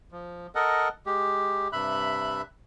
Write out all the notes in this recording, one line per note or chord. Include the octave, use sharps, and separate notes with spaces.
F3
A4 A#4 D#5 F#5
G#3 G4
G2 C3 E5 B5 F#6